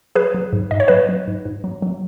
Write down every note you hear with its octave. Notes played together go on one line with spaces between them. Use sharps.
F#3 G#4 B4
F#3
G#2
G#2 D#5
C#5
F#3 B4 D#5
F#3
G#2
G#2
F#3
F#3